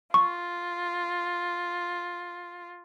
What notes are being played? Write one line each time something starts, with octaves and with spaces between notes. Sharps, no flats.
F4 C#6